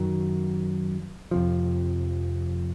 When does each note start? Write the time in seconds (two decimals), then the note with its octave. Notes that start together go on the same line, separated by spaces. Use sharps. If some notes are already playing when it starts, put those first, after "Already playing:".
Already playing: F#2 D#3 F#3
1.31 F2 C3 F3